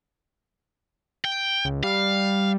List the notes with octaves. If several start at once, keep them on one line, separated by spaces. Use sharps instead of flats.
G5
C#2
G3 F5